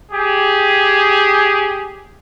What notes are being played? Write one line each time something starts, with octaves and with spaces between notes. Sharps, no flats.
G4 G#4